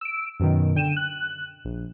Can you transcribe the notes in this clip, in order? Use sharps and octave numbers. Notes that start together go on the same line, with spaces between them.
E6 D7
F#2 B2 D#3
D3 G5 D#7 E7
F#6
A#1